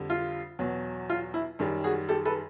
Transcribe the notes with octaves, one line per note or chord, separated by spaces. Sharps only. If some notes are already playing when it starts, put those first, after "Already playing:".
Already playing: F2 D3 G3
F4
E2 B2 F#3
F4
E4
F#2 D#3 G3
F#4 G#4
G4 A4
A4 B4